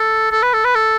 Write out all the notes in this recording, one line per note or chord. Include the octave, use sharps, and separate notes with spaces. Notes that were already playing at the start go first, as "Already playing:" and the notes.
Already playing: A4
A4
B4
A4
B4
A4